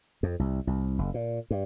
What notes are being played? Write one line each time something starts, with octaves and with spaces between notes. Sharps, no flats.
F2
C2
C2
F#1
A#2
G2